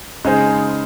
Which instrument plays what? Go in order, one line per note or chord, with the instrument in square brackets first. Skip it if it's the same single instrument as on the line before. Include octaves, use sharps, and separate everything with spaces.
[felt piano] C#3 G#3 D#4 G#4 C5